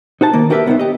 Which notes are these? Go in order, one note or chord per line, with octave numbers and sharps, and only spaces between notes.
D#4 F#4 C5 A5
D#3 A#3
D4 F#4 G4 A#4 B4 E5
C2 B3 C#4 D#4 C5
G4 D#5